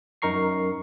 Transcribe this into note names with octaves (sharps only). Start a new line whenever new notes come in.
F#2 D#4 A#4 A#5 C#6 C7